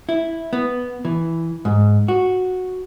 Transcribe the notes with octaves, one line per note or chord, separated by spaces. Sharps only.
E4
B3
E3
G#2
F#4